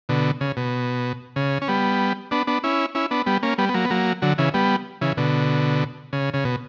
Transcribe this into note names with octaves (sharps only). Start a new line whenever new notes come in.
B2 D3
C#3
B2
C#3
C#4
G3 B3
B3 D4
B3 D4
C#4 E4
C#4 E4
B3 D4
G3 B3
A#3 C#4
G3 B3
B3
F#3 A#3
B3
F#3 A#3
D3 F#3
C#3 E3
G3 B3
C#3 E3
B2 D3
C#3
C#3
B2